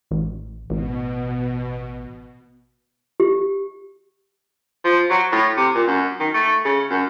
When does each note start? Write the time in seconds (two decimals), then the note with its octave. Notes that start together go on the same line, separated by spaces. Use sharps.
0.11 A1
0.70 A1 B2
3.20 G4
4.84 F3
5.10 F#3
5.32 A2
5.57 C3
5.75 A#2
5.87 F#2
6.20 D#3
6.34 A3
6.65 C#3
6.90 F#2